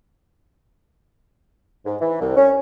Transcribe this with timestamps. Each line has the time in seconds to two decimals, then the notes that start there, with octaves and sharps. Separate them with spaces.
1.86 G#2
2.01 E3
2.20 C2
2.37 C#4